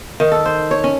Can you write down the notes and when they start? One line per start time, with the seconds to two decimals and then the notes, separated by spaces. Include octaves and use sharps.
0.20 D#3
0.32 A4
0.46 C5
0.71 C#5
0.84 C#4